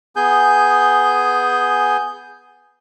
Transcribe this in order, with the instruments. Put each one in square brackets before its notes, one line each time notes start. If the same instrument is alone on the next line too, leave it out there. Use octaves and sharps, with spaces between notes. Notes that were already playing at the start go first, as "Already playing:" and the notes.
[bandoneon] B3 G#4 G#5 G6